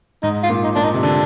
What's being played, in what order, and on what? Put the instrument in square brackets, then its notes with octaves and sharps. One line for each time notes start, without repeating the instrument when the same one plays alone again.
[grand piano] G#2 [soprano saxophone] D#4
[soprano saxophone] F4
[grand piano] A#2
[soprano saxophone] D#4
[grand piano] A#2 [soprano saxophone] D4
[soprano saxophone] D#4
[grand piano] C3
[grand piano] D3 [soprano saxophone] D4